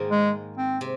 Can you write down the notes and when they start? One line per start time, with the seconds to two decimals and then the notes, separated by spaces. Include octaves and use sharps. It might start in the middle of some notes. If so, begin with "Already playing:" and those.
Already playing: G#2 D#3 A#3
0.11 G#3
0.58 C4
0.81 C3